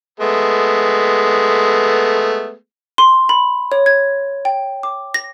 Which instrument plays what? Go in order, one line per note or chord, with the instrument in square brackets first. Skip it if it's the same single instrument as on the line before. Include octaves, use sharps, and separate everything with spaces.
[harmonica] G#3 A3 B3
[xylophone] C6
B5
C#5
G#6
G5
D6
A#6